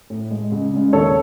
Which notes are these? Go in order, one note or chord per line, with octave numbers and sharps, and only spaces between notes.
A2
G#3
C#2
C#3 G#3
D#2 A4 C#5